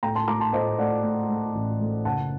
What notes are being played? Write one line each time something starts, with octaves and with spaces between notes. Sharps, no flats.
A2 G5 A#5
A5 C6
A3 A#5 D6
A5 C6
A2 C5 D#5
A3 D5 F#5
A2
A3
A1
A3
F#1 F#5 A5